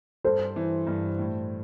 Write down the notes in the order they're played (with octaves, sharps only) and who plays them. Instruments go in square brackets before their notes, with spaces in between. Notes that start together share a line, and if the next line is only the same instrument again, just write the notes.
[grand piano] G2 [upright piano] A4 C5
[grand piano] E3
G2
A2